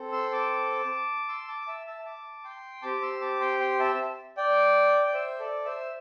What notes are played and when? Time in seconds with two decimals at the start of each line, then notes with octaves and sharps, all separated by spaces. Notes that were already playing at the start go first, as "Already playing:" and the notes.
Already playing: C4 A4
0.12 C6 E6
0.32 A5 D6
1.29 C6 E6
1.48 A5 D6
1.67 E5 A5
1.87 E5 A5
2.05 A5 D6
2.44 G5 C6
2.82 C4 G4 A5 D6
3.02 C6 E6
3.21 A5 D6
3.40 G5 C6
3.60 G5 C6
3.80 E5 A5
4.37 D5 G5
5.07 D5
5.13 C5 E5
5.39 A4 D5
5.65 C5 E5